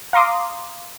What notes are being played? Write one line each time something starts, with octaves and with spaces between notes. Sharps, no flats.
F5 A#5 C6 D6 D#6